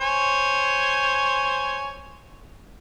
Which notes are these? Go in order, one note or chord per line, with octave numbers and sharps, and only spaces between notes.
C5 C#5 G#5